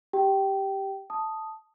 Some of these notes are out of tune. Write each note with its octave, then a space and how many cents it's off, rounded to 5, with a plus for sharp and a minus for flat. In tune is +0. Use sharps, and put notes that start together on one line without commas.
G4 +0 G5 -15
A5 +0 D#6 +0